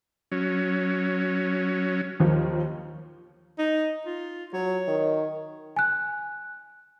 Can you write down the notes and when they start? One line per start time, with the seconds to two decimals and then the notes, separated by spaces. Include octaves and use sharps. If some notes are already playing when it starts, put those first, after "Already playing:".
0.32 F#3 C#4
2.20 D#2 D#3 F3
3.59 D#4
4.06 F4
4.54 F#3 C#5
4.88 D#3
5.76 G#5 F#6